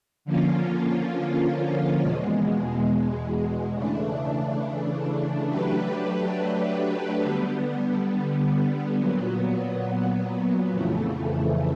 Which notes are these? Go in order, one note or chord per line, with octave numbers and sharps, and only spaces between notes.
D3 F3 A#3 C#4 F4
E2 B2 G#3
C#3 E3 A3 D4
F#3 A3 D4 G4 B4
D3 G3 B3
A#2 F#3 B3
F2 C#3 E3 A3